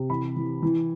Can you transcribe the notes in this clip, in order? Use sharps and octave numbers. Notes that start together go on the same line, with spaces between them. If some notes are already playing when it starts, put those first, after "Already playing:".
Already playing: C3
E3 B5
E3
E3